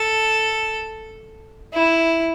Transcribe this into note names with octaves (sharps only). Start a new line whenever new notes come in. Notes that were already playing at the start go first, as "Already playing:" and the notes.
Already playing: A4
E4